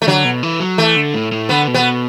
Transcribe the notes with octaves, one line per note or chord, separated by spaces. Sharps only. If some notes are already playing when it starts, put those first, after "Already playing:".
A3
D3 F#3
B2
E3
F#3
E3 A3
D3
A2
A2
D3 B3
B2
B3